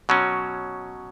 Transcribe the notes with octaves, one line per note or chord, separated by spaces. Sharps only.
B2 F#3 C#4